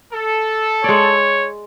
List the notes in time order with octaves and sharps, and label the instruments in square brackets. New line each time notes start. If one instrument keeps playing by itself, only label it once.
[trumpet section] A4
[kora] G#3 D5 [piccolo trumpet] C#5